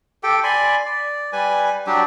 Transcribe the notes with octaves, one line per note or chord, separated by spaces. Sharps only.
G4 A4 G5
D5 G#5 B5 C6
D5
G3 B4 G#5
F#3 G3 D4 G4